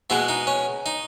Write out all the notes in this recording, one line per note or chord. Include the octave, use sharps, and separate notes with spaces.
B2 G#3 B3 E4
D#4
C#4
D#4